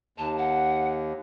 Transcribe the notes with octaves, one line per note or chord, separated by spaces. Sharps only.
D#2 A5
F#5